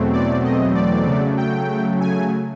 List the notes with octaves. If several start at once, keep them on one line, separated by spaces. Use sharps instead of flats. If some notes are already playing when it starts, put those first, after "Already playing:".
Already playing: E2 B2 F#3 A3 C4
D5
D#5
D5
C#3 F#3 A3
G5
G#5